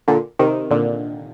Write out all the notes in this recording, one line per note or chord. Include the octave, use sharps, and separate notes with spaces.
A#2 D3
C3 D#3
A#2 D3